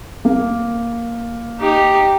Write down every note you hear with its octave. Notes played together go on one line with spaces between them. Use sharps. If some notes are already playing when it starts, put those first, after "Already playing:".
A#3
D#4 G4